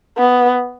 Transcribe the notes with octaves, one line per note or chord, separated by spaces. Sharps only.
B3